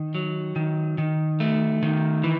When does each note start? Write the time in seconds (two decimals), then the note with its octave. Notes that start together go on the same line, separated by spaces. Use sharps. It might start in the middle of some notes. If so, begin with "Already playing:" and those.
Already playing: D#3
0.15 F#3
0.56 D#3
0.98 D#3
1.40 A3
1.83 D#3
2.24 E3